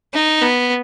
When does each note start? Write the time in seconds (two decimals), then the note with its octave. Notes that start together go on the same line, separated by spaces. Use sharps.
0.13 D#4
0.42 B3